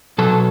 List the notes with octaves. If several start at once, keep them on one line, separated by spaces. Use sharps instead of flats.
B2 F#3 A4